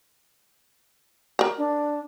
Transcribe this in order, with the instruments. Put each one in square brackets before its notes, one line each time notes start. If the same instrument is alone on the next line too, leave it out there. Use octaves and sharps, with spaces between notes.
[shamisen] A#4 A#5
[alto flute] D4